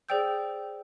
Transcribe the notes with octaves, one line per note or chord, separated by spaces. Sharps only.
G#4 C5 D5 G5 E6 G6